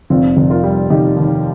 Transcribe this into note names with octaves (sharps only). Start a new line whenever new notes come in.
F1 C4 F4
F1
F4 A#4
G3
F1 D#4 G4
D#2